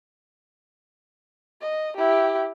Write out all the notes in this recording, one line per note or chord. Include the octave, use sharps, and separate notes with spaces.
D#5
E4 G4